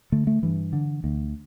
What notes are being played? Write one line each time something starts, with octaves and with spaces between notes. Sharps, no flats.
D3 A3
A3
G2 E3
D3
D2